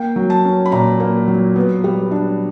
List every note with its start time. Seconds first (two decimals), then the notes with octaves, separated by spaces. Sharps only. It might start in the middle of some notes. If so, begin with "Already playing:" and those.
Already playing: A#3 G5
0.16 F#3
0.30 A5
0.45 C#4
0.66 B5
0.72 A#2 A#5
1.00 A#3
1.28 F#3
1.56 B3
1.84 G3
2.11 D4